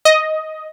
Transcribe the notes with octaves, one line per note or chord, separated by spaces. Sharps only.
D#5